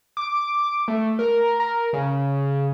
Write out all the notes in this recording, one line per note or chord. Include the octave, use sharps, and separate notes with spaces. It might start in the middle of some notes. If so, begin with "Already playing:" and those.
D6
A3
A#4
A#4
C#3